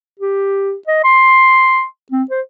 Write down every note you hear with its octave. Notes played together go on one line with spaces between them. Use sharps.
G4
D#5
C6
C4
C5